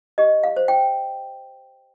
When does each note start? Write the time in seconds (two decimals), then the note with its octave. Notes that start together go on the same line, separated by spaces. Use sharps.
0.18 G4 D#5
0.43 F5
0.56 C5
0.68 G5